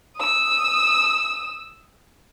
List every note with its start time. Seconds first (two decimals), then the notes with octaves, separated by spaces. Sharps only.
0.16 D#6 E6